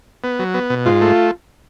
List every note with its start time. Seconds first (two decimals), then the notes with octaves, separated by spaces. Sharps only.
0.24 B3
0.39 F#3
0.54 B3
0.70 B2
0.86 G#2 F4
1.01 A3